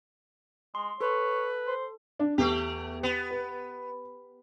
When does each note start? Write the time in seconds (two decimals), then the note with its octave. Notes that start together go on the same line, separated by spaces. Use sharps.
0.75 G#3 C6
1.01 A4 B4 C#5
1.67 C5
2.19 D4
2.38 E2 A3 G4
3.03 B3
3.31 B4